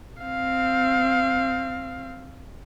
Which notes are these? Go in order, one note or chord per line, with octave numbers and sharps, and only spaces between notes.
C4 F5